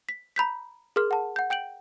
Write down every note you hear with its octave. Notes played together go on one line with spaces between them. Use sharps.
B6
A#5 B5 G6 B6
G#4 A#4 C6 F6
F#5 A5
F#5 G6
G5 G6 D7 F#7